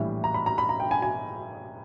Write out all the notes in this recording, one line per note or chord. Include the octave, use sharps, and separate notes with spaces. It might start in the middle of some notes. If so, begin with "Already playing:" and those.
Already playing: A#1 A2 E3 G3
A#5
B5
A#5
B5
A#5
G5
G#5
G#5